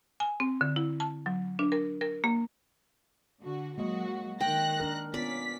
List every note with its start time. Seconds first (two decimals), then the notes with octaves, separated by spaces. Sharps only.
0.20 G#5
0.40 C4
0.61 D3
0.76 E4
1.00 A5
1.26 F#3
1.59 D4
1.72 A#4
2.01 A#4
2.24 A#3
3.41 D3 F#4
3.78 F#3 G#3 A#3 F#4 D#5
4.41 D#3 G5 F#6 A#6
4.80 D4 A#4
5.14 B3 C#4 F4 D5 B6